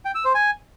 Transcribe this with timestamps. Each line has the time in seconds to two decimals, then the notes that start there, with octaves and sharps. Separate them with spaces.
0.05 G5
0.15 E6
0.25 C5
0.34 G#5